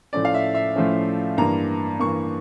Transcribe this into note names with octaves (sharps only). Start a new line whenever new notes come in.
A2 F3 A3 C#4 D5
F5
E5
E5
A2 F3 A3 C#4
G2 E3 A#3 A#5
G2 E3 A#3 C#6